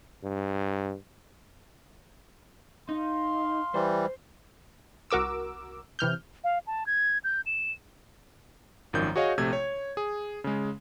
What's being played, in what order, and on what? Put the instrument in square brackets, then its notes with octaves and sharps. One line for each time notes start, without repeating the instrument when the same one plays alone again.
[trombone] G2
[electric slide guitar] D#4 [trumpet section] F5 C6
[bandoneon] E3 G3 [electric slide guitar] C5
[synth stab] C2 F#4 A#4 D6 E6
C3 E3 F6 G6
[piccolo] F5
A5
G#6
G6
E7
[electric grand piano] G#1 F#2 D#3 F3 G6
F#4 G#4 C#5 D#5 F5
A#1 C3 A3 G#6
C#5
G#4
C#3 G#3